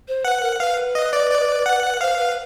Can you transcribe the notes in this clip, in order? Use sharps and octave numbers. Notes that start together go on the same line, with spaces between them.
C5
B4 F#5
A#4
B4 F5
D#5
D5
D5
F#5
C5 F5
B4